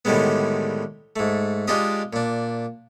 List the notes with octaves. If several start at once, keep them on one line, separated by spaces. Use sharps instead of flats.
A2 D3 D#3 G3 G#3 B3
G#2 A3
G#3 D4 D#4 F4 G4 D#5
A#2 D4